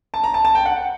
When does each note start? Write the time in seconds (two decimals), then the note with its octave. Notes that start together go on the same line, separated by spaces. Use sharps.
0.14 A5
0.24 A#5
0.34 A5
0.45 A5
0.55 G5
0.66 F#5